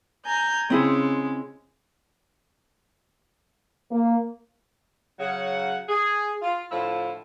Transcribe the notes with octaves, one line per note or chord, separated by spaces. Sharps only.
G#5 A#5 G6
C#3 G#3 C4 E4 G#4
A#3
C#3 F#3 F#5
G#4
F4
A2 D3 F3 E4 F4